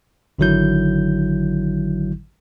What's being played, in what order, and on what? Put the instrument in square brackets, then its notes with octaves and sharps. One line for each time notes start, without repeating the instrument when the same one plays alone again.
[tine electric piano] G#1 D3 D#3 F#3 E4 G6